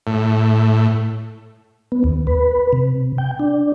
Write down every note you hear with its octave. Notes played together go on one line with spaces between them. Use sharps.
A2
B3
D#2
B4
C3
G5
D4